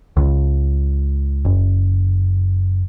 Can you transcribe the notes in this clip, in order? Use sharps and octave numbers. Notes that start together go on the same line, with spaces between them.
C#2
F#1